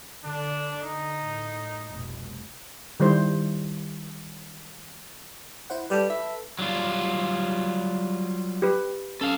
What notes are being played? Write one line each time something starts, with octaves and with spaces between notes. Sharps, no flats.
D3 D4
D#4
A2
F1 C2 B2
D#3 G3 E4 C5
E4 C5 F#5
G3 A4 B4
E5
F#3 G3 F4
G4 B4
C#4 A4 F5